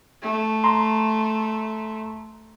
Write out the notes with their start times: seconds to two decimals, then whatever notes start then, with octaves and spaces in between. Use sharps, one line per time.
0.22 A3
0.64 A#5 C6